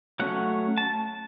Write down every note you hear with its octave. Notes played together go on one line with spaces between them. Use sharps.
F#3 A3 C#4 F#5
A5